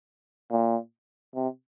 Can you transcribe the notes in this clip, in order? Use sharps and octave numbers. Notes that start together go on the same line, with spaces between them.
A#2
C3